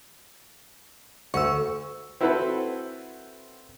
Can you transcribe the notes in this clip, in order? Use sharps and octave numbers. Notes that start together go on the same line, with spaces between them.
D2 C#6 E6
C4 E4 F#4 A4 B4 C5